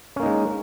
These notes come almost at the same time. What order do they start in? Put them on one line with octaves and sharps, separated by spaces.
C#4 A#3 D#4 G#3